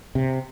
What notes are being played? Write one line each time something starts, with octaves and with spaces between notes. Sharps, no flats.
C3